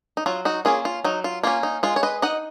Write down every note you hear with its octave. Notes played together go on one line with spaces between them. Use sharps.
D#4
F#3 F4
D#4 F#4
A#3 C#4 F4 G#4
F4
F#3 D#4
F4
A#3 C#4 F4
D#4
G#3 F4
C#5
B4 D#5
D#4 D#5 F#5